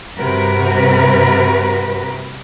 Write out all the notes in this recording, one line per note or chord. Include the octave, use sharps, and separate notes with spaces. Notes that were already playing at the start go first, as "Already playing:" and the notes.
G2 C3 F#4 A#4 B4